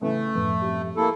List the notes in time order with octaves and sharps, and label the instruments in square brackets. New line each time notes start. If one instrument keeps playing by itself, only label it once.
[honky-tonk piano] C#3 E3 B3 [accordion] A3
[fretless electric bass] F#2 A2 F3 [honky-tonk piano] B3
[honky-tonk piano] G3 C4
[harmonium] A#3 E4 A4